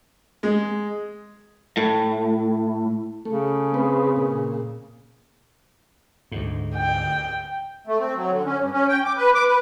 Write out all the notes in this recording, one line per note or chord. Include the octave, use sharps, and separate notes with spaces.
G#3
A2
C#3 A3
C4 B4
A#2
D2 G#2
G5
A3
C4
F#3
D3
C#4
G2
C#4
G5
D6
B4
D6
B4